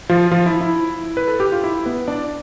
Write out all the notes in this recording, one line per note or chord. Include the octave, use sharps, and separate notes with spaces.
F3 F4
F3 F4
E4
E4
B4
A4
G4
F4
E4
B3 B4
D4 D5